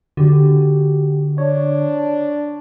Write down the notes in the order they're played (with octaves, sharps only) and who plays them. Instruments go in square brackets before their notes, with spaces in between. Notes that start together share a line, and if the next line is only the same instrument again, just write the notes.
[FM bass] D3 [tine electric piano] F#4 G4
[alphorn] D4 [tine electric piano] C#5